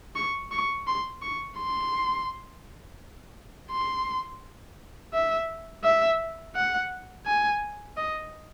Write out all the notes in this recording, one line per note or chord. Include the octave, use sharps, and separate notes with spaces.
C#6
C#6
C6
C#6
C6
C6
E5
E5
F#5
G#5
D#5